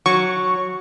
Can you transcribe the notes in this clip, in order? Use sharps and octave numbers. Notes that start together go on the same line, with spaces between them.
F#3 C#6